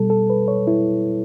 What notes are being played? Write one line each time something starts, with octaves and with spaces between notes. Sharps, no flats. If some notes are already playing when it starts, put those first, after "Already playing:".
Already playing: B2 G3 A4
A4
B4
C#5
E4